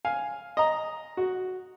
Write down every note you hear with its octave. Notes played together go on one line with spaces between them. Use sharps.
F5 G#5
D#5 A#5
F#4